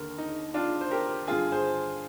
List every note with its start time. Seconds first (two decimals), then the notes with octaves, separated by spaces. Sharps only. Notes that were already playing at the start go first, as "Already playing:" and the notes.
Already playing: D#2 D3 A#4
0.18 D#4
0.54 D4 F4
0.81 C5
0.91 G4 A#4
1.27 G2 D3 F4 G#4
1.52 G#4 C5